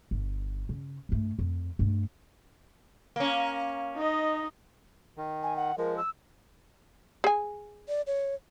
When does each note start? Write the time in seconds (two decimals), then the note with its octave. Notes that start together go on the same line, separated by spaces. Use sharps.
0.11 G1
0.69 C#3
1.09 G2 A3
1.39 F2
1.79 G2 A3
3.16 A#3 C#4
3.96 D#4 D#5
5.17 D#3
5.43 G#5
5.56 F#5
5.78 F3 G#3 A#4
5.97 E6
7.24 G#4 G#5
7.88 D5
8.07 C#5